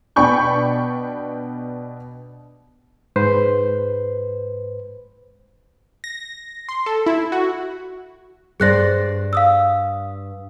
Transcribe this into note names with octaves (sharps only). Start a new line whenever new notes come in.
B2 D4 G5 B5 C#6 G6
G#2 B4 C5
A#6
C6
A4
E4
F#4
G2 G#4 C5 D5 F#6 A#6
F5 D#6 E6